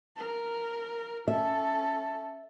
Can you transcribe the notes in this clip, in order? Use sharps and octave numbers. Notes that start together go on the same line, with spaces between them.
A#4
C#4 A4 E5